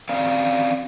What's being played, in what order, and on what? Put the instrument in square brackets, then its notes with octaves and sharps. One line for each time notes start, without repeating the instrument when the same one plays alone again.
[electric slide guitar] C4 C#4 D5 F5